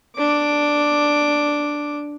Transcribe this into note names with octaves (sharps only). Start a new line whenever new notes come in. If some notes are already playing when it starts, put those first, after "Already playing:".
D4 D6